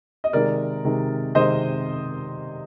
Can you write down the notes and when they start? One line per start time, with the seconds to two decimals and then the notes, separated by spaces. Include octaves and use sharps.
0.24 D#5
0.33 C3 D#3 G#3 A#4 D5
0.85 C3 D#3 G#3
1.35 C3 D#3 G#3 C5 D#5